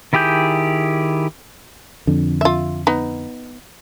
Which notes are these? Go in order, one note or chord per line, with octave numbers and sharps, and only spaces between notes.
D#3 E4 G4 G#4 G6
F2 D3
F4 E5
B3 D#4